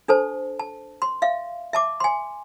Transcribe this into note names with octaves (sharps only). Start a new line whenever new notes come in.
D4 A4 C5 A5
A5
C6
E5 F5
E5 A5 D6
G#5 C6